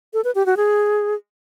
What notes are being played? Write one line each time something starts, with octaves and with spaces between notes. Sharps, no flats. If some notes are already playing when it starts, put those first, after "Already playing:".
A4
B4
G4
F#4
G#4